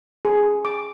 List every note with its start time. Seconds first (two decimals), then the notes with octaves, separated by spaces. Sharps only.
0.25 G#4
0.65 D6